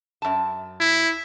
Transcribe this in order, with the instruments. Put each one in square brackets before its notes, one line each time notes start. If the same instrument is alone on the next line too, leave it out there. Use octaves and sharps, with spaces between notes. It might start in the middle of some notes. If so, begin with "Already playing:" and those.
[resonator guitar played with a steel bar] F#2 A5
[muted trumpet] E4